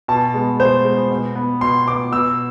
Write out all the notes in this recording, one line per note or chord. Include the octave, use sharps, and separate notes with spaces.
B2 A5
G#3 B3
B2 C5
G#3
B3
B2
B3
B2 C6
B3 D6
B2 E6